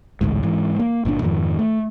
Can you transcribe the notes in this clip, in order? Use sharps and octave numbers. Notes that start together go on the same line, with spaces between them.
A1 D2 G#2
G#2 E3
A#3
G1 A#2 C#3 D4
F2 G#2 D#3 F3
A3